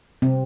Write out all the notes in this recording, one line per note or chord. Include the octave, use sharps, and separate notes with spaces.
C3 C4